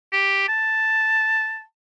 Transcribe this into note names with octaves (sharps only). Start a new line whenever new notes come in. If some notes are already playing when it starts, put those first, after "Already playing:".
G4
A5